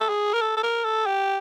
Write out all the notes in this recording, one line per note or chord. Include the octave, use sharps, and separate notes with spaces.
A4
G#4
A#4
A4
A4
A#4
A4
G4